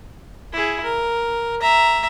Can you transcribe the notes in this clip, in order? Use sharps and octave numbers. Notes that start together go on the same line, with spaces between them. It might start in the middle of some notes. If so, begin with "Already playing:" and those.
E4 G#4
A#4
E5 A#5